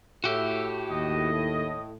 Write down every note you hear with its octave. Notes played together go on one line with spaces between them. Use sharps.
A2 F#4 G4 E5
D#2 D#5